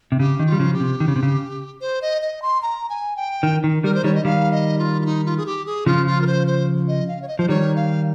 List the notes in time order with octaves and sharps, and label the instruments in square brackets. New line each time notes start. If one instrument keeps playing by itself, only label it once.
[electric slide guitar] C3
[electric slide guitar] C#3 [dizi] G4
[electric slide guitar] D#3
[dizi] F4
[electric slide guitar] G3
C#3 F3
[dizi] G4
[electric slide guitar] C3
D#3
C#3
C3
C#3
[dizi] C5
D#5
D#5
C6
A#5
G#5
G5
[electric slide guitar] D#3
D#3
[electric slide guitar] D#3 G3 [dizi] A#4
[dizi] C5
[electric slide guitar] D#3 G3 [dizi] C#5
[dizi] D#5
[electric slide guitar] D#3 G3 [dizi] F5
[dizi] D#5
F4
F4
D#4
F4
G#4
G4
G#4
[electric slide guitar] C#3 F3 [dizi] F4
[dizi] F4
A#4
C5
C5
D#5
F5
C#5
D#5
[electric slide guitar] F3 [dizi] C5
[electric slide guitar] D#3 G3 [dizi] C#5
[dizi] F5